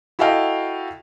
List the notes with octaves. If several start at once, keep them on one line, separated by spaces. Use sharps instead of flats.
E4 F#4 A4 D#5 F5 G5